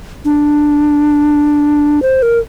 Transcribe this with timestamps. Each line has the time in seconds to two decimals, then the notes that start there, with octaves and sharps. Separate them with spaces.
0.25 D4
2.02 C5
2.22 A#4